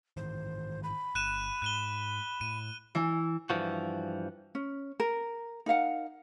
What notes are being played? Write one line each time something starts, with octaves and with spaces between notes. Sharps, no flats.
G#2 D#3 E3 C5
B5
G1 F#6 D#7 E7
G#2 F#6 D#7 G7
A2 D#7
E3
G2 E3 F3 F#4
C#4
A#4
D#4 A#4 F5 F#5